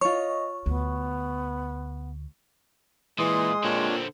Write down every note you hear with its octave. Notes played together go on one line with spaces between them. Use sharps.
F4 C#5 D#5 C#6
D2 B3
A#2 E3 G#3 C6 D#6
A#2 D3 C4 D4 F4 C#5